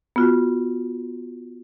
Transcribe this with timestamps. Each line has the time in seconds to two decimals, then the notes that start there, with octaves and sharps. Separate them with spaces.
0.16 B3 F4 F#4